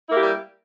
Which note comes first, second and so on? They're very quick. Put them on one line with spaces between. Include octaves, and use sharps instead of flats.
E4 A#3 G4 G3